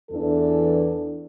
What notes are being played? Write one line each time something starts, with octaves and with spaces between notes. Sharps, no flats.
E2 E3 D4 A4